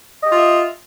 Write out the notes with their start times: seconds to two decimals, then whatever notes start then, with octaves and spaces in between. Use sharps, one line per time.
0.21 D#5
0.26 G4
0.30 F4
0.35 E5